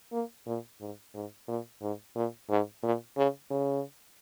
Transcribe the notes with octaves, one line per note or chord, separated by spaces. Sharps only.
A#3
A#2
G#2
G#2
A#2
G#2
A#2
G#2
A#2
C#3
C#3